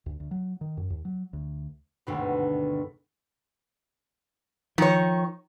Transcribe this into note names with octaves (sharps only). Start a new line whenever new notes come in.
D2
D2
F#3
D#3
F#2
D#2
F#3
D2
G#1 D2 G2 B2
D#3 F3 C#5